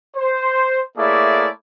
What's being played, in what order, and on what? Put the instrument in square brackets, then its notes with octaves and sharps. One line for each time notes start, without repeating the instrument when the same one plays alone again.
[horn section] C5
A3 A#3 E4 G#4 C#5 D5